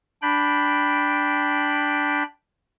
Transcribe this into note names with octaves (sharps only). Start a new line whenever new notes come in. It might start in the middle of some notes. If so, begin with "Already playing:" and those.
D4 G5 B5